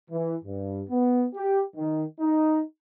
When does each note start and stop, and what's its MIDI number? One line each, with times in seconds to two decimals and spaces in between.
0.10 0.35 52
0.44 0.81 43
0.90 1.25 59
1.34 1.59 67
1.76 2.03 51
2.20 2.60 63